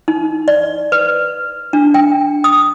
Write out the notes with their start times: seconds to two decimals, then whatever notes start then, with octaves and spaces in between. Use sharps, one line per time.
0.08 D#4
0.48 D5
0.92 B4
1.73 D4
1.94 G5
2.44 D#6